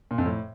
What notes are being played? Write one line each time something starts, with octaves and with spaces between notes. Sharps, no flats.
A#2
F2
A2